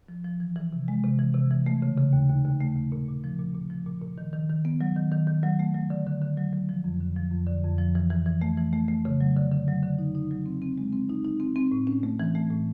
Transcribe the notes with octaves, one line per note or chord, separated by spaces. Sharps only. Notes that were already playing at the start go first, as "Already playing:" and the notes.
F3
F3
E3
E3
C3
G#3
C3
E3
C3
E3
A3
C#3
C#3
D#2
D#2
D#2
A3
D#2
A#2
A#2
F3
A#2
A#2
F3
A#2
A#2
D#3
D#3
D#3
B3
F#3
D#3
D#3
D#3
F#3
A3
F#3
D3
D3
D3
F#3
F#3
F3
F2
D3
F3
F2
D3
F2
F3
E3
E3
E3
A3
E3
A3
A3
C#3
F#3
D3
D3
F#3
D3
D#4
D#4
F#3
C4
C4
G#3
C4
D#4
D#4
C4
C4
A2
C#4
A3
E3
A3
A2